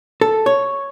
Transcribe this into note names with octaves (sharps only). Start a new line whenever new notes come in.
A4
C#5